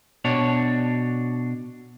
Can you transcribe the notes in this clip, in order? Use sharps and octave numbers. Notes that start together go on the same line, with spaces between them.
B2 D4 C#5